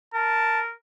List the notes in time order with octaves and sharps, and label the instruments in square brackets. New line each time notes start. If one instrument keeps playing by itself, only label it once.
[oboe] A#4 [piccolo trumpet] A5